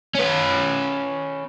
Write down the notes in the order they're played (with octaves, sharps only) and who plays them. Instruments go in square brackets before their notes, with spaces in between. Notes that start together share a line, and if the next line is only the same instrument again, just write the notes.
[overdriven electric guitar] C#4 B4